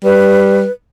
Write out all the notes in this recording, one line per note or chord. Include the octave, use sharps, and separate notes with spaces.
G3 B4